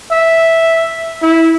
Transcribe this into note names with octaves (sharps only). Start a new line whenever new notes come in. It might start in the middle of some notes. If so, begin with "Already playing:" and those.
E5
E4